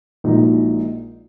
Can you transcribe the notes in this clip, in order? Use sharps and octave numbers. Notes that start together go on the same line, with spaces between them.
A#1 A#2 G#3 D#4 F#4